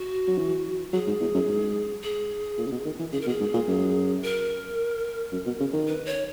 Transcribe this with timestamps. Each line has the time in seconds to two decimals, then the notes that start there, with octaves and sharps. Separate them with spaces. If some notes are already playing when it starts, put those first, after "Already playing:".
Already playing: F#4
0.27 F#3
0.38 E3
0.93 F#3 G#4
1.07 G#2
1.21 E2
1.34 F#2
1.48 G#2
2.03 G#4
2.58 A#2
2.66 C#3
2.72 B2
2.85 D#3
2.99 E3
3.13 C#3 G#4
3.21 A#4
3.27 B2 G#4
3.40 G#2
3.54 A#2
3.67 F#2
4.23 A#4
5.32 F#2
5.46 B2
5.60 C#3
5.73 D#3
5.88 B4
6.06 C#5